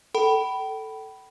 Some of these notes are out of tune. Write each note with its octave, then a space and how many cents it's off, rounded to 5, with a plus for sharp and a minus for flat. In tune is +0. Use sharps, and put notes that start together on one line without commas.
A4 +0 G5 -35 B5 +0